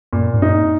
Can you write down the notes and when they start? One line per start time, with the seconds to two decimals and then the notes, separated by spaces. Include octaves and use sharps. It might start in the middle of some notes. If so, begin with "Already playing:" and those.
0.13 F#2 A#2
0.34 G#2
0.42 F#2 D#4